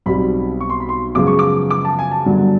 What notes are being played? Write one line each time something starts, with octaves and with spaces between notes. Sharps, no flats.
B1 B2 G3 C4 B5
C#6
C6
B5
C6
F#2 C#3 F3 G#3 B3 D6
C#6
D6
D6
A5
G#5
A5
G1 G2 D3 F#3